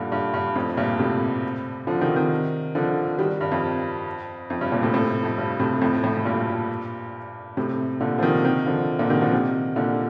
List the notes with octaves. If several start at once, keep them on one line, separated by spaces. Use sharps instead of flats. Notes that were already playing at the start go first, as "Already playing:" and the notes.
Already playing: G2 A#2 D3
G2
G2
F2 A2
G2 A#2
A2 C3
D3 F3
C3 D#3
C3 D#3
D3 F3
D#3 G3
G2
F2
F2
G2
G2 A#2
A2 C3
A2 C3
F2
G2
A2 C3
F2 A2
F2 A2
A2
G2 A#2
A2 C3
A#2 D3
F3
C3 D#3
C3 D#3
D3 F3
A#2 D3
C3 D#3
D3 F3
C3 D#3
A#2 D3